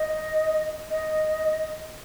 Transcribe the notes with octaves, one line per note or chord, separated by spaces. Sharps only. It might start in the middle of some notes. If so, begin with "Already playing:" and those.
Already playing: D#5
D#5